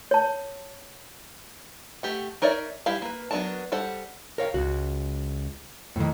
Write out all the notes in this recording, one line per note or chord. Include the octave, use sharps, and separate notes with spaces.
C#5 A5
A3 G4 F#5
D#4 A#4 C#5 D5 E5
G3 E4 G4 F5
A#3 B4
F#3 B3 D4 A#4 A5
G3 A4 C5 F#5
A#4 C#5 F5
C#2 F#4
F2 A2 D#3